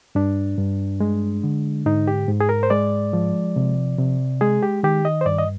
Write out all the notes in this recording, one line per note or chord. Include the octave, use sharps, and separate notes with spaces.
G2 D4
G2
G#3
D3
G#2 D#4
G4
G#2
G#4
A#4
C5
G#3 D5
F3
C3
C3
G#3 G#4
G4
D#3 G4
D#5
C5
G2 D5
D#5